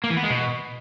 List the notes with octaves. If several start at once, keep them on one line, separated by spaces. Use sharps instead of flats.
A#3
E3
B3
G#3
B2